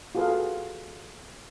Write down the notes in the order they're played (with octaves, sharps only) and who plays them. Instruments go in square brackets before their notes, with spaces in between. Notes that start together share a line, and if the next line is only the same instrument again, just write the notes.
[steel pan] F4 F#4 G#4 A4 B4 F5